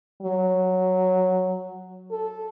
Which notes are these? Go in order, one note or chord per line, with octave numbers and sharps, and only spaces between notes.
F#3
A4